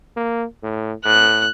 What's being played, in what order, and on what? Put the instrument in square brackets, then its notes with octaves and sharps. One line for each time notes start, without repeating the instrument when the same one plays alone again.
[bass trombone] A#3
A2
[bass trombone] A2 [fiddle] F#6